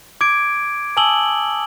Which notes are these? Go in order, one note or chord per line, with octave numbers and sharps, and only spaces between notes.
D6 G#6 D7
G#5 A5 D#6 E6 F#7 G7